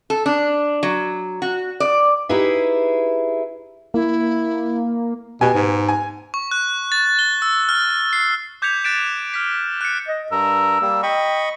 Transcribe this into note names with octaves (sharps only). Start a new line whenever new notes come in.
A4
D4
F#3
F#4
D5
D#4 E4 G4 G#4 B4 E5
A#3 E4
B2 B3 G4 G#5
G#2
G#5
C#6
F#6
A6
G7
E6
F6
C7
D6 G6 G#6 B6 C#7 F7
F#6 A6 B6 D7 E7
F6 B6
F#6 C#7
D#5
G2 A#4 E6
G3 A#3
D#5 G5 B5 C#6